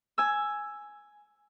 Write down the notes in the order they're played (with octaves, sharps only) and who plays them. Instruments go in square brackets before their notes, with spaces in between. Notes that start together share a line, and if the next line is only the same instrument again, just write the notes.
[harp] G#5 E6